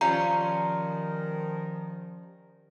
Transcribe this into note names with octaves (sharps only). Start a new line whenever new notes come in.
D#3 F3 G3 C#4 F4 A#5